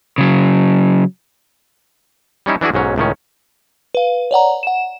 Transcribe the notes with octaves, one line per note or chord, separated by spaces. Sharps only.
C#3 F#3
G3 C#4 D#4 E4
E3 D4 E4 F#4 G#4
B1 G#2 F#3 C#4
C#2 A2 D#3 C#4
B4 F5
C#5 D5 F#5 A#5
F#5 E7